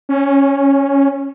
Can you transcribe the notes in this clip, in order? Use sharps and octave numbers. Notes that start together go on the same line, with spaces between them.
C#4